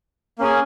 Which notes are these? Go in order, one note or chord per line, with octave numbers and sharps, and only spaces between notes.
A#3 C#4 G#4